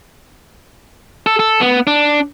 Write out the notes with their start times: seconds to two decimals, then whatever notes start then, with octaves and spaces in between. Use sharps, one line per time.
1.26 A4
1.39 A4
1.61 B3
1.87 D4